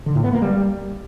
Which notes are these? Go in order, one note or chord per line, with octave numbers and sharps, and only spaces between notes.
D3
A2
B3
A#3
G3